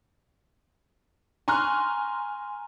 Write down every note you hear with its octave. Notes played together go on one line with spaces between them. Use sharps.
G#5 A#5 C6 C#6 F6 F#6